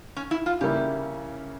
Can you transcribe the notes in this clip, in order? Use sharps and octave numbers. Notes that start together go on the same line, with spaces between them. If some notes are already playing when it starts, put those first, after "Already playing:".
C#4
E4
F4
C#3 G3 A#3 E4 G4